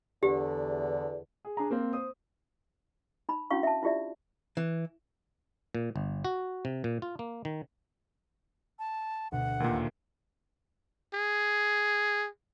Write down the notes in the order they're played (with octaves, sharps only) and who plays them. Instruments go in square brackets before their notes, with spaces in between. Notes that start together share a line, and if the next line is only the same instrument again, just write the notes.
[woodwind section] E2 D3 [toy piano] G4
[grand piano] G#4
D4 G#4 A#5
A#3 C4 C5
C5 D#6
[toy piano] D#4 B5
C#4 D4 E4 F#4 F5 C#6
E5 A5
E4 F4 G4 D5 E5
[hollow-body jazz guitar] E3
[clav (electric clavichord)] A#2
G1
F#4
C3
A#2
F4
A#3
D#3
[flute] A5
[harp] D2 B2 [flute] F#5
[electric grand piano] D#2 A#2 [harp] A3 A#4 B4
[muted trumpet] G#4